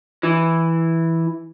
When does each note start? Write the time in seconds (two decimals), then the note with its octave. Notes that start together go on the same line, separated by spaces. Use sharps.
0.23 E3